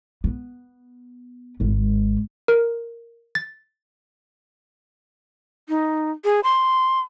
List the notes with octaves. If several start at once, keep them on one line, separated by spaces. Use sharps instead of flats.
B3
G#1 G#3
A#4
A6
D#4
G#4
C6